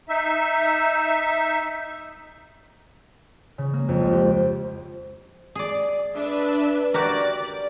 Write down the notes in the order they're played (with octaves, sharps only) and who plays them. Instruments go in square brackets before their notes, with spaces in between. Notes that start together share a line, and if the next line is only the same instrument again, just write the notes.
[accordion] D#4 E5
[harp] C#3
A#3
F2
C#2
G4
[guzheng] G#4 D5
[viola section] D4 B4 E5
[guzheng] F#4 G4 A#4 [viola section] D5